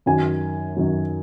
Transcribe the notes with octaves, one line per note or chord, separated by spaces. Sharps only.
F#2 D#3 F#3 G#5
F#2 D#3 F#3